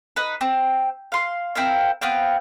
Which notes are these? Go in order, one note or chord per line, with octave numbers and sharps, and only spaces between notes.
D#4 B4
C4
F5 C6
C4 E4 A#4 F5
B3 C4 F5 G5